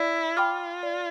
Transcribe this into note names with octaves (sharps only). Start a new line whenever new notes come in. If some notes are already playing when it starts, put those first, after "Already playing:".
Already playing: E4 D5
F4 G5 B5 D6 F6
D5